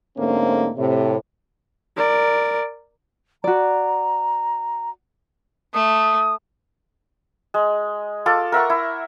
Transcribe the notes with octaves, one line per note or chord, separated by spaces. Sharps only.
G#2 D3 A3 A#3 C4 C#4
A2 C3
A#4 D5
F#4 D5 A#5
A3 D#6
G#3
F4 A4 A5 D6
A#4 E5 F#5 C#6
E4